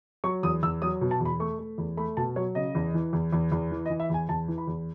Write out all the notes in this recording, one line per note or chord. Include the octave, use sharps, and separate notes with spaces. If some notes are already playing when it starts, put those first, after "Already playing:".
F#3 C#6
E2 D#6
E2 E6
F#3 D#6
B2
A5
E2
B5
A3 C#6
A3
E2
A3 B5
B2 A5
F#3 C#5
C#3 D#5
E2
E3
E2
E2
E2
E3
D#5
E3
E5
E2 G#5
E2 A5
E3
B5
E2